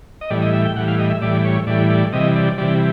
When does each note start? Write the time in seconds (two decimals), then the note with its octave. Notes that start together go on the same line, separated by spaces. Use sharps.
0.21 D#5
0.30 A2 E3 G3 D5
0.42 D#5
0.53 E5
0.65 G5
0.76 A2 E3 G3 F#5
0.88 F5
0.99 D#5
1.10 E5
1.21 A2 E3 G3 D5
1.44 C#5
1.67 A2 E3 G3 D5
1.90 D5
2.13 C3 E3 G3 D#5
2.36 D5
2.58 C3 E3 G3 D5